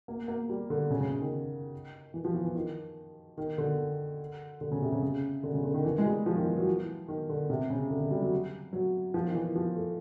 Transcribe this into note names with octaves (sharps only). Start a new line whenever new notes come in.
A#3
A#3
G3
D3
C#3
C#3
C#3
D#3
E3
F3
E3
E3
D#3
D#3
D3
D3
C#3
C3
C#3
C#3
D3
C#3
D3
D#3
E3
G#3
G3
F3
D#3
E3
F#3
E3
D#3
D3
C3
C#3
D3
D3
G3
F#3
F#3
F3
D#3
E3
F3
A3